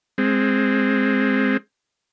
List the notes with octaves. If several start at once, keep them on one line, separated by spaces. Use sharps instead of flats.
G#3 C4